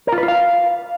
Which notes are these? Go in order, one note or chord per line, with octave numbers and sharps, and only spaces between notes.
A#4
F4
B4
F4
F5